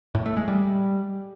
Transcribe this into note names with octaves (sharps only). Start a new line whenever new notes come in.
A2
A3
G#3
G3